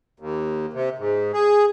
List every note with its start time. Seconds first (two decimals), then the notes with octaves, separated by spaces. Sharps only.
0.20 D#2
0.73 C3
0.99 G#2
1.34 G#4